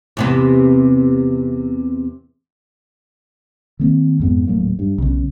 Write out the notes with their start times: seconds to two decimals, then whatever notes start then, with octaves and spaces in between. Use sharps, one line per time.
0.17 E2 C3 B3
3.80 D#3 A#3 C4
4.20 F2 G#2 B3
4.47 D#1 A2 F#3 A#3
4.79 G2
4.98 B1 C#3